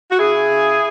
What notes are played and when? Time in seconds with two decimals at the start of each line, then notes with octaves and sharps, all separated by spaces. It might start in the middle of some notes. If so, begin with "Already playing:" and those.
0.11 F#4
0.19 C#3 E4 G#4
0.49 C#3